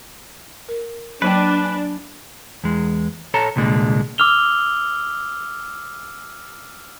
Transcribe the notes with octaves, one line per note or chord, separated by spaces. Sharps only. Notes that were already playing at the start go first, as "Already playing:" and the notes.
A#4
F#3 A#3 D4 B4 G5
G#5
E2 G#3
A4 C#5 A5 A#5
C2 A#2 D3 G#3
D6 E6 F6 F7 G7